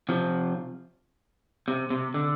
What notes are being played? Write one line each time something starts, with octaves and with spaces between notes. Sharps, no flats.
C3 F3
C3
C3
D3